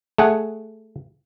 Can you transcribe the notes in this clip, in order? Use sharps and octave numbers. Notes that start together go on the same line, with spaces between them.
A3 G#4 F#5